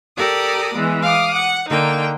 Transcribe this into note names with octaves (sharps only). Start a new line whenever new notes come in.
G4 A4 A#4 D5 D#6
E3 G#3 B3
F5 D6 D#6
F#5
D3 A#3 D#4 G5